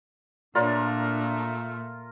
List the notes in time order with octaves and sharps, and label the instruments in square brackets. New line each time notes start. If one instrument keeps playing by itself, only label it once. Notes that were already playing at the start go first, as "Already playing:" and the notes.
[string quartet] A#2 A3 [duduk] D4 [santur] F4 A#4 [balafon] C#5 D5 C6